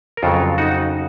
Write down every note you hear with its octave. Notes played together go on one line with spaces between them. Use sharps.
A#4
F2 C#3 F#3 F4 A4
D#4 F#4